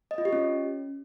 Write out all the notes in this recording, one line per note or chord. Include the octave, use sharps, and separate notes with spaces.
D#5
F4
G4
C#4